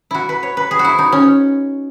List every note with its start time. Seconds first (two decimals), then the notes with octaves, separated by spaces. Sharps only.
0.11 E4 F#4
0.29 B4
0.43 C#5
0.57 B4
0.71 G#4
0.79 F#4
0.85 E4
0.98 D#4
1.12 C#4